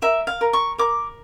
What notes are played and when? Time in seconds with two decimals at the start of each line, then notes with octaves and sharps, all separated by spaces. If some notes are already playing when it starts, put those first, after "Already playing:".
0.02 A#4 E5
0.27 F5
0.41 A#4
0.53 C#6
0.78 A#4 D6